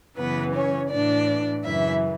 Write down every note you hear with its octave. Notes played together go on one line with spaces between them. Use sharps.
F#2 C#3 E3 B3 B4
C#4 C#5
A2 E3 D4 D5
F#2 C#3 E3 E4 E5